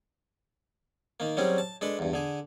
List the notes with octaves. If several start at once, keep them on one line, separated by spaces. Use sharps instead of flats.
D#3 A#3
F#3 G3 C4 C#4 G#4
A5
G#3 D4 A4 B4
E2 G2
D3 G#4